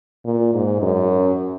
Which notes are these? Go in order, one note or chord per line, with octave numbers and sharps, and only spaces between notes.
A#2
G#2
F#2